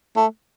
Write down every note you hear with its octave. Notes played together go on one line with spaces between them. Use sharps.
A3